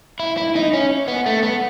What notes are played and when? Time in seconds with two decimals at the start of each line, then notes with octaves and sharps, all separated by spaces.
0.20 E4
0.37 E4
0.56 D#4
0.73 C#4
1.08 B3
1.26 A3
1.43 B3